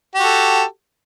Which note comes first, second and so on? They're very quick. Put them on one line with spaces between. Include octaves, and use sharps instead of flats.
G4 F#4 A4